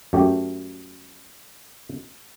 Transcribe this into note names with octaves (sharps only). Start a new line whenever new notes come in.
F#2 A3 G4